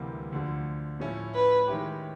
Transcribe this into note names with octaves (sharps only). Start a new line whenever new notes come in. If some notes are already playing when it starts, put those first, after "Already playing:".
Already playing: D2 C3 E3 G3 A#3
D2 D3 F3
A2 F3 A3 C#4 E4
B4
D#3 G#3 C#4 E4 G4